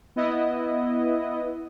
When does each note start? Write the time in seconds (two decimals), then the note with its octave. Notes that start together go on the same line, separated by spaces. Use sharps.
0.16 B3 E4 D#5